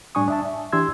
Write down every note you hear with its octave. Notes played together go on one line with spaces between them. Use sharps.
A2 G3 D4 G#5 C#6 D#6
D4 E5 A5
E5
E3 D4 G4 C6 E6 G#6